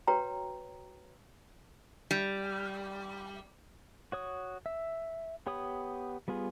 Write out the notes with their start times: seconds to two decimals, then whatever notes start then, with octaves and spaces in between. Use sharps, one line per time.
0.07 F#4 B4 C#5 G5 A#5
2.11 G3
4.12 F#4 C#5 D#6
4.66 E5
5.47 B3 G4 C#5 B5 D#6
6.28 G3 B3 F4 G#4